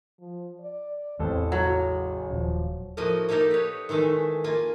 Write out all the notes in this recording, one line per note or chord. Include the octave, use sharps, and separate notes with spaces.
F3
D5
A1 E2 C4 A4
C#3 F#3
D#1 F3
A2 F3 A#3 F#4 D#5
A#3 D#4 G4 A4 A#4
B4 C#5
D#3 E3 G#3 A3
A#3 F4 G#5